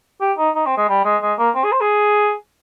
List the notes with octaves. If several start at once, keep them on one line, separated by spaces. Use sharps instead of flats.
G4
D#4
D#4
C4
G#3
G3
G#3
G#3
A#3
C4
G#4
C5
G#4